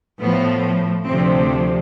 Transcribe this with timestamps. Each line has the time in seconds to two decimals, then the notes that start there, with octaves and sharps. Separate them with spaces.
0.22 A2 F3 B3
1.07 D2 C3 F3 C4